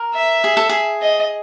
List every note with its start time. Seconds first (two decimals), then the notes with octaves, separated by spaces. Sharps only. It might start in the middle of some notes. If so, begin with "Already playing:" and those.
Already playing: A#4
0.14 E5
0.44 G#4
0.57 A4
0.69 G#4
1.02 D#5